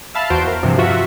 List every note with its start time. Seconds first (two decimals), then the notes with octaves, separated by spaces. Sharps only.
0.15 E5 F5 A5 B5 F6
0.30 E2 F#4 C5 C6 D7
0.48 A#4
0.63 G2 C3 E3 F3
0.78 F4 F#4 E5